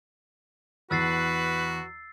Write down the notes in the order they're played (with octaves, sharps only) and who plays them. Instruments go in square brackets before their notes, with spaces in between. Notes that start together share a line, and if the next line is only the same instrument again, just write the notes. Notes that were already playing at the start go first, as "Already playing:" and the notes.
[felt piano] E2 [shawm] F#4 [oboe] B4 [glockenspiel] E6 A6 C7